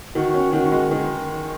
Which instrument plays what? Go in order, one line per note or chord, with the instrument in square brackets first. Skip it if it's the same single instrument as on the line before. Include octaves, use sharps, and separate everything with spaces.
[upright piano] D#3 [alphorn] F#4
[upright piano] C#4
[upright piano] D#3 [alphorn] F#4
[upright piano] G#3
D#3